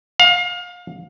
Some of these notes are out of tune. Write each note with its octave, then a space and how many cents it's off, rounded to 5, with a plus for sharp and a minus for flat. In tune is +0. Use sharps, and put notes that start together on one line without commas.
F5 +30